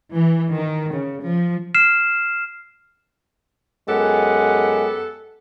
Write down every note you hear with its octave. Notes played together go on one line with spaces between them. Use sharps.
E3
D#3
C#3
F3
F6 C7 E7
F#2 G#3 B3 G4 A4 F#5